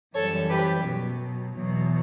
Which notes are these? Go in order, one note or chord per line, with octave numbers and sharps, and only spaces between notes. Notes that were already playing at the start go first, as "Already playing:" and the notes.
F#2 E3 G3 A4 C#5
G4 B4
B2 F#3
E2 B2 F#3